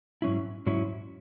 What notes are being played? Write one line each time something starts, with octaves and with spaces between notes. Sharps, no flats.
G#2 F#3 C#4 E4
G#2 F#3 C#4 E4